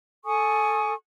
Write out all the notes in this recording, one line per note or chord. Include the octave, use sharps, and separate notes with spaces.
A4 G#5 C#6 D#6